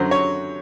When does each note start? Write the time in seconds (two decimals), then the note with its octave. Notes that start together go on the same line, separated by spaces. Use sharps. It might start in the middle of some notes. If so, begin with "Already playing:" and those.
Already playing: F#2 D3 F#3 C5
0.11 C#5